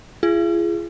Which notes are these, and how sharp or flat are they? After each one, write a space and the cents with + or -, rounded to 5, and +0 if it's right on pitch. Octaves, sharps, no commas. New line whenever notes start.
F4 -45 G#4 +0